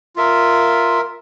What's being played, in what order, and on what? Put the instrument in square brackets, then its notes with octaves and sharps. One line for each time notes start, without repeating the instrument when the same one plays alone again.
[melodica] F4 A#4 E5